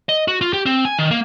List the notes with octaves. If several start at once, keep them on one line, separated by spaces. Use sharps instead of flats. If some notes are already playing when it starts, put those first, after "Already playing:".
D#5
F#4
F4
G4
C4
G#5
D#3
A#3